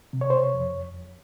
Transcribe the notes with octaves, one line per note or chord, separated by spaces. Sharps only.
C3
C#5
C5
C#5
F2